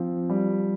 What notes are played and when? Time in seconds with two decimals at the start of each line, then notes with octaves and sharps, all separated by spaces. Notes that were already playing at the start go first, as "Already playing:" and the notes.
Already playing: F3 C4
0.29 G3